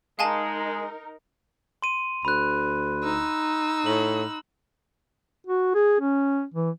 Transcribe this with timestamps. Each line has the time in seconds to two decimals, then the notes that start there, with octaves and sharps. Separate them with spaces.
0.19 G#3 D#4 A#4 F5 G#5 A5
1.82 C6 D#7
2.25 D2 B5 F#6
3.03 D#4 E6
3.86 A2 F#7
5.47 F#4
5.74 G#4
6.00 C#4
6.54 E3